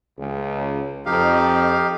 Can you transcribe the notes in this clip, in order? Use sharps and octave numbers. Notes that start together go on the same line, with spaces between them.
C#2
F2 D#4 G4 F5